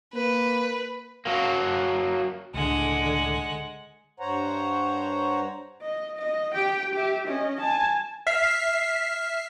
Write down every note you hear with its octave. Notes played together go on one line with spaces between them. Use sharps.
A#3 B4
F#3 A#3
C#2 A2 D3 G#3 F#5
G2 C5 C#5 F#5 A#5
D#5
D#5
G4 G5
G4 E5
C#4 D#5
G#5 A5
E5 F6 B6 C7